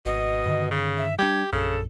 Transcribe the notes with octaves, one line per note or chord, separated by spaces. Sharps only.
G#1 B2 D#5
G2 D3 D#3
C#3
E5
G3 D4 G4 G#6
A#1 F#2 C#3 A4